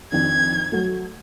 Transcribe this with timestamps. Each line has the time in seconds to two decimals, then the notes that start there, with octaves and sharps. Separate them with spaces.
0.12 F2 D#3 D4 G#6
0.72 F#3 A3